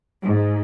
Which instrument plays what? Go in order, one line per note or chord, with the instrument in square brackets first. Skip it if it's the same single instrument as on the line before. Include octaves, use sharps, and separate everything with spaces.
[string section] G#2